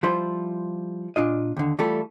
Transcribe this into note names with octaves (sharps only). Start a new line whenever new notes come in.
F3 G3 E4 F4 C5
A#2 D4 F4 D#5
D#2 D3
E3 G3 A3 F4 A4